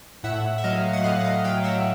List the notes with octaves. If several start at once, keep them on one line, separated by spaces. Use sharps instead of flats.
A2 E5 F#5
E5
F#3 D#5 F5
F#5
A2 D#5 F5
F#5
D#5 F5
F#3 F5 G5
E5 F#5